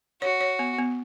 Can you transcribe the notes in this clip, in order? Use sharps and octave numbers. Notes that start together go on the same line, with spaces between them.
F#4 C#5
C#5
B3
B3